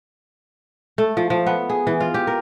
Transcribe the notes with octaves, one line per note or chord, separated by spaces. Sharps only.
A3
F3
F3
B3
G#4
E3
F4
G4
A#4